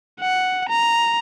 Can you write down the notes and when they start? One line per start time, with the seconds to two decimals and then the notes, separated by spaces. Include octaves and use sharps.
0.21 F#5
0.69 A#5